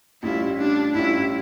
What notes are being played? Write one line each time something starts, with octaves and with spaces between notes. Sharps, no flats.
A1 A2 G3 C#4 E4 F4
D4
A1 A2 G3 C#4 E4 F4